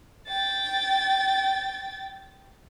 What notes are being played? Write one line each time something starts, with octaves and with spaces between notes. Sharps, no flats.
G5 A6